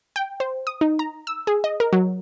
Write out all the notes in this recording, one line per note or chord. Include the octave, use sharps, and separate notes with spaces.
G5
C5
D#6
D#4
A#5
E6
G#4
D#5
A#4
F#3